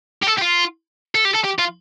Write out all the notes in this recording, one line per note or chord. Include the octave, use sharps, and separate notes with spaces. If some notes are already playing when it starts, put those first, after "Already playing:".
G4
A4
G4
F4
A4
G4
A4
G4
F4